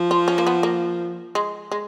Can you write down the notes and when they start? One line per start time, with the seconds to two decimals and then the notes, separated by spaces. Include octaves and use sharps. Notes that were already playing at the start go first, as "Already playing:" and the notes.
Already playing: F3
0.11 F4
0.28 C#4
0.38 A#3
0.47 B3
0.63 A#3
1.35 G#3
1.72 G#3